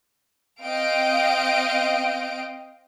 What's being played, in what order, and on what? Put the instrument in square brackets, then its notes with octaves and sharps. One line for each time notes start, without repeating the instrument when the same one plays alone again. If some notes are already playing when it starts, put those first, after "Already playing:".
[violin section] C4 D#5 F5 G5 D7